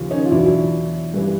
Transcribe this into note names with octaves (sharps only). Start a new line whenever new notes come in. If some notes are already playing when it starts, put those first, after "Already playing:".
Already playing: D#2 C#3 F3
C#4 D#4
F4
E2 B2 F#3 D4 E4
G2 E3